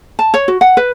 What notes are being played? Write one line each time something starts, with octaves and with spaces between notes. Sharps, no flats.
A5
C#5
F#4
F#5
B4